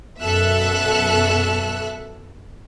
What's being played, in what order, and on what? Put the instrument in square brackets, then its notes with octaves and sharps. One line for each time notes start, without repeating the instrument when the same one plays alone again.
[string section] F#2 B2 A4 E5 E6 F#6